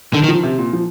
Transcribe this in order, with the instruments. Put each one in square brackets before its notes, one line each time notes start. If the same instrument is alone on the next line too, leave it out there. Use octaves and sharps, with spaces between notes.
[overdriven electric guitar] D3 [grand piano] D#3
[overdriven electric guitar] D#3
[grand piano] F3
C3
A#2
F3